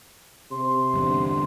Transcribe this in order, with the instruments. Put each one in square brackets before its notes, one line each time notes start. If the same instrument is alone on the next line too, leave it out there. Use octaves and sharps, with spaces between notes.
[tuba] C3 [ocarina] C6
[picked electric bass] E2 G2 D3